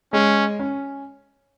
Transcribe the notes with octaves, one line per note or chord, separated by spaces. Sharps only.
G#3 C#4
C#4